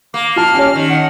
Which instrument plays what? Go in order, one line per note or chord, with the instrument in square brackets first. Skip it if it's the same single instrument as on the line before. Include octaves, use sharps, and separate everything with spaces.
[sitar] A#3 [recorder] D6
[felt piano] F4 A5 [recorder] F6
[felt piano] C#4 G4 C#5
[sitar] D#3
[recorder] F#5